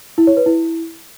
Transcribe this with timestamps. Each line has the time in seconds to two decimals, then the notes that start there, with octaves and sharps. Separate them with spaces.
0.18 E4
0.27 C#5
0.37 B4
0.46 E4